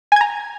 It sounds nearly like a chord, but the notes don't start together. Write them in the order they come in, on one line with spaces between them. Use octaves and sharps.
G#5 G#6 A#5